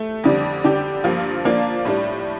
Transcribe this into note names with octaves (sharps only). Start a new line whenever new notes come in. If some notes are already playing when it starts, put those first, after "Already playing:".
Already playing: A3
F2 D3 G3 D4
D3 G3 D4 G4
G2 F3 A#3 F4
F3 A#3 D4 F4
A2 G3 D4